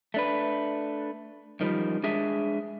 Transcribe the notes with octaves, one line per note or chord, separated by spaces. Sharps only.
A3 D4 B4
F#2 D#3 F3 G3
G#3 D4 G#4 E5